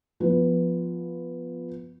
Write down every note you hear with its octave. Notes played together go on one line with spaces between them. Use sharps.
F3 B3